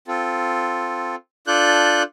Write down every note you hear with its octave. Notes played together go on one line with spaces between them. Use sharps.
C4 F4 A4
D4 F4 A4 D5 F#6 G6